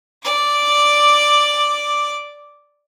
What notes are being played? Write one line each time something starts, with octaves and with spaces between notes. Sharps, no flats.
D5 D6